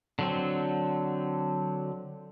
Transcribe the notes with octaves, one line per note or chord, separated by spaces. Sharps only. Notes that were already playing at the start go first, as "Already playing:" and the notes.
D3 F#3 C4